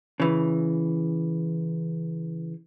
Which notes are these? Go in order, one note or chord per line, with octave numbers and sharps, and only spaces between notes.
C#3 E3